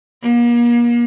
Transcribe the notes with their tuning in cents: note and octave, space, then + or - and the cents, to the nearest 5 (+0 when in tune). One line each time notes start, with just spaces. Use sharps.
A#3 +40